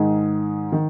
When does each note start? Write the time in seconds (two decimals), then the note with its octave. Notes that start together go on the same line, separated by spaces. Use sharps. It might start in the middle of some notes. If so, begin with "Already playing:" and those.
Already playing: G#2 D#3 G#3 D#4 G#4
0.72 D#3